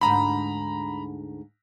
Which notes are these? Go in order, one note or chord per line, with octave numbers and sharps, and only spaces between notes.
D2 G#2 A#5 B5